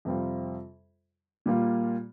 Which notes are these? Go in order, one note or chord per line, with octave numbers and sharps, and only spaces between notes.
F2 C3 G3 C4 F4
A#2 G3 A#3 F4